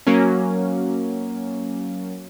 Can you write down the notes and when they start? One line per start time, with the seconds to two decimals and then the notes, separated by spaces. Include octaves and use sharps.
0.07 F#3 A#3 C#4